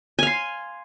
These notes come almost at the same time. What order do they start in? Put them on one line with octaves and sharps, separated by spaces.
G#5 F5 C6